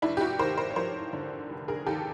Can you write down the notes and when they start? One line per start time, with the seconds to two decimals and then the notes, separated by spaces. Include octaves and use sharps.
0.02 F1 D4 E4
0.17 G4
0.21 E4 F#4
0.39 D#2 A#4 C5
0.57 A#4 C5
0.70 C#5
0.76 F3 A#4 C5
1.13 D3
1.50 F1
1.68 G#4 A#4
1.87 D#2 G4 A4